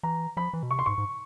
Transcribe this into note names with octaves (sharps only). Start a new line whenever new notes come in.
E3 A#5
F3 B5
E3
B2
C3 C#6
C6
G#2 C#6
G#2